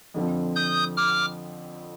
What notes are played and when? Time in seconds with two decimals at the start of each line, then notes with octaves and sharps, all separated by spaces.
0.14 F2 D3 F3 C4
0.55 D#6 G6
0.97 D6 F6